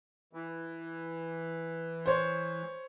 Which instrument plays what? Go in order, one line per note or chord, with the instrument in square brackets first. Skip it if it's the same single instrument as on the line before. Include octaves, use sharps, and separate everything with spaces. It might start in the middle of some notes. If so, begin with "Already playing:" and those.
[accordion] E3
[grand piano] C5 C#5